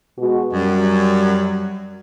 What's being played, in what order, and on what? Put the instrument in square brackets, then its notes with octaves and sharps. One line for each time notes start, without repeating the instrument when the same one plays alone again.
[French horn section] B2 G#3 F#4
[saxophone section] F#2 [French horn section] G3